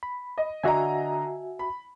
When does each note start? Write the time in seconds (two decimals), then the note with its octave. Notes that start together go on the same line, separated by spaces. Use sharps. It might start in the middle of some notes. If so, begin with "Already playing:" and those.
0.03 B5
0.38 D#5
0.64 D3 F#4 D#5 E5 G#5 A#5
1.59 B5